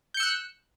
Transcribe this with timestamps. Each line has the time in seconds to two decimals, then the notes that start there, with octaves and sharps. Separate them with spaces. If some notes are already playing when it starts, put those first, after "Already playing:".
0.14 G6
0.17 C#7
0.20 E6
0.23 F#6